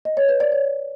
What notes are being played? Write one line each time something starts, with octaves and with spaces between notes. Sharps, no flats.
D#5
C#5
B4
D5
C#5